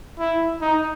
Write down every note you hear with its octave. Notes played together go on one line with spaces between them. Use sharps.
E4
D#4